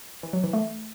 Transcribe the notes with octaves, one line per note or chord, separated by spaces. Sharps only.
E3
F#3
E3
A3